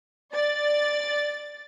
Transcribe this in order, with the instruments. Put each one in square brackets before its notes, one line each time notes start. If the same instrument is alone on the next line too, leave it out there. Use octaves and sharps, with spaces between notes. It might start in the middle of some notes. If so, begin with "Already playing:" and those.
[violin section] D5 A6